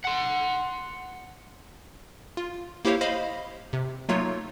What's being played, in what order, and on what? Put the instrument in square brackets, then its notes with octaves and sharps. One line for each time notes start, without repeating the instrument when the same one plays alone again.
[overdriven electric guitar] F#5 C6
[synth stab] F4
A#3 E4 G4 C5 C#5 F5
C5 D#5 F5 B5
C3
F#3 A3 A#3 D#4 F4 C#5